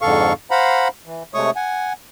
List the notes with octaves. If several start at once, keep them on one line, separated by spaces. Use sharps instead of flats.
F2 G#2 D3 A4 F5 C#6
C5 F5 F#5 A#5 B5
E3
C3 G#3 A3 C#5 C#6 D#6
F#5 G#5